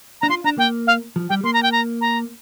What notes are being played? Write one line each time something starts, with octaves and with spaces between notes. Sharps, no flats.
D4 A#5
F4 C6
D4 A#5
A#3 G5
F5
F3
G3 G5
A#3 C6
A#5
G5
A#5
A#5